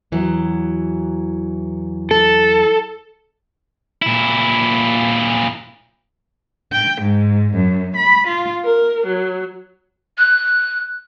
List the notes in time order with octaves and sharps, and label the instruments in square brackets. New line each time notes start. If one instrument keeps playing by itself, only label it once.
[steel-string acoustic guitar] E2 E3 F#3
[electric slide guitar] A4
[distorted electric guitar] A#2 E4
[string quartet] G5
G#2
F#2
B5
F4
A#4
F#3
[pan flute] F#6